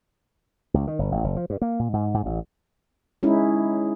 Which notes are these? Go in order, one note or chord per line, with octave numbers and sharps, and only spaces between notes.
C#2
D#3
G1
A1
F#1
F3
G2
A#3
A#2
G#2
G#2
A1
G#3 C#4 D#4 E4